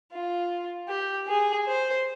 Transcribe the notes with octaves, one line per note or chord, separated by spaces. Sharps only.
F4
G4
G#4
C5